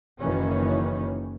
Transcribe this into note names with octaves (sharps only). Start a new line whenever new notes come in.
F#1 D#3 E3 C#4